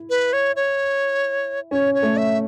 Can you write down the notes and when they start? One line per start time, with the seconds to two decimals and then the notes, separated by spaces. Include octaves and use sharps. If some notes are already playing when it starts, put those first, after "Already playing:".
Already playing: E4
0.10 B4
0.33 C#5
0.56 C#5
1.71 C#4 C#5
1.94 C#5
2.02 A3
2.17 E5